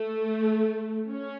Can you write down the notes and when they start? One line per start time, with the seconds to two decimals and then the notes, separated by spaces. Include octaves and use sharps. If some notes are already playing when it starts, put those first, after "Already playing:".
Already playing: A3
1.08 C#4